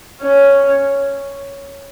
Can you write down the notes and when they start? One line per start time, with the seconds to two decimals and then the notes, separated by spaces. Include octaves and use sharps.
0.22 C#4